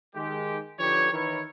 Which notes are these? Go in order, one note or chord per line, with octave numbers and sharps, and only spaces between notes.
D#3 G#3 G4
D3 F3 D#4 G4 B4 C#5
D#3 E3 E4 A#4 B4 C#5